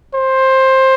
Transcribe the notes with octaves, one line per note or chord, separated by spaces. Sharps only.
C5